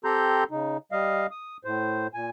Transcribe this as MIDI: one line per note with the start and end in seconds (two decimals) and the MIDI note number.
0.05 0.44 60
0.05 0.44 67
0.05 0.44 69
0.05 0.44 82
0.05 0.44 84
0.05 0.44 91
0.51 0.77 49
0.51 0.77 63
0.92 1.27 55
0.92 1.27 75
0.92 1.27 77
1.31 1.57 87
1.65 2.07 45
1.65 2.07 72
2.14 2.30 46
2.14 2.30 80